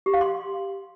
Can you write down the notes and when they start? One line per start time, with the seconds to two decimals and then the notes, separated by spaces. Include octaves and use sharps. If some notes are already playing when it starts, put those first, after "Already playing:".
0.06 G4
0.14 F5
0.21 C6